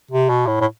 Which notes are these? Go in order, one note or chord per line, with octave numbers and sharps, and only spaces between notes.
C3
B2
A2
A2